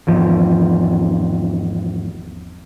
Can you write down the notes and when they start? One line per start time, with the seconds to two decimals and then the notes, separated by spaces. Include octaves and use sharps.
0.07 G#1 E2 F3